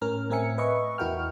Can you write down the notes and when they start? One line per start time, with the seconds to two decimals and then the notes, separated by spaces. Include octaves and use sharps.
0.01 A2 C#4 A#4 F6
0.30 A2 C4 A#4 E5 G#5 C#7
0.58 B4 D#5 E5 C#6
0.98 E2 E4 F#4 A#4 G5 F6